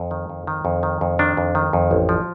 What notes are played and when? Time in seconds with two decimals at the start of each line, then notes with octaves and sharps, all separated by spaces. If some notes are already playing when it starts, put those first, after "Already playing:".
Already playing: F2
0.11 D#3
0.29 F2
0.47 D#3
0.65 F2
0.83 D#3
1.01 F2
1.19 D#3 D4
1.37 F2
1.55 D#3
1.73 F2
1.91 A1
2.09 F3